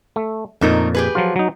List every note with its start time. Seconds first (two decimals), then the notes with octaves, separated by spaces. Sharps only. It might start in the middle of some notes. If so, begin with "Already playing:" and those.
0.16 A3
0.61 F2 A#2 A3 D#4 A#4
0.95 G4 G#4 B4
1.15 F3 F#3 F4
1.36 F#3 D#4